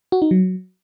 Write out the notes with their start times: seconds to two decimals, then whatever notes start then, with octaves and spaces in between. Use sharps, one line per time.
0.12 F#4
0.22 D#4
0.31 F#3